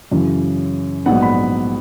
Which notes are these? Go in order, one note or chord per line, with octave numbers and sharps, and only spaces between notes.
F#2 C#3 E3
A#1 G#2 F#3 B3 F#5
B5